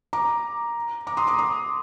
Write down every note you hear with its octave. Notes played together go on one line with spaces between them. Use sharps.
A#5 D6
A#5 D6
C6 D#6
A#5 D6
C6 D#6